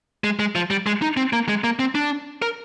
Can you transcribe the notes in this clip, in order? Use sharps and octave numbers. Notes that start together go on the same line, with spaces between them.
G#3
G#3
F3
G3
G#3
D#4
C4
A#3
G#3
A#3
C4
D4
A#4